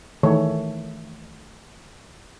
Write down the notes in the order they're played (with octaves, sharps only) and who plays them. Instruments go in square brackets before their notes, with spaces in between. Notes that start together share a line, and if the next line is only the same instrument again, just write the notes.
[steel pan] D#3 E3 A3 G#4 C#5